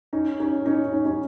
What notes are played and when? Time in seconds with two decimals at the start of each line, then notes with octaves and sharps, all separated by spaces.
0.13 C#4 D#4
0.40 C#4 D#4
0.66 C#4 D#4
0.93 C#4 D#4
1.05 C#4 D#4